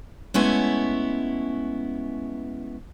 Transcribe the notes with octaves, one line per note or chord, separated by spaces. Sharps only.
G#3 A3 B3 C#4 E4